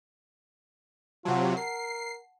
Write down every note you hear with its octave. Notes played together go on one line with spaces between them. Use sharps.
C3 F#3 F4 F#5 A5
A#4 C7